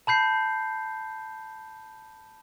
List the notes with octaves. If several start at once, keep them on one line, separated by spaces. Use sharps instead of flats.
A5 B5 G6 C7